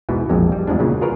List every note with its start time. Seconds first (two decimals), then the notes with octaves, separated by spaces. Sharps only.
0.09 E2 G#2 B2 E3
0.29 A#1 F2 G#3
0.52 G3
0.67 E2 G#2 F3 G#3 D4
0.79 A#2 C#3 F#3
1.01 F4 G#4 A#4 B4 C#5